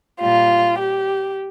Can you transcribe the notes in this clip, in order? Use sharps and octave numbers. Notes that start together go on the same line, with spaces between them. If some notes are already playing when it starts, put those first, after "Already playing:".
A#2 G3 F4
G4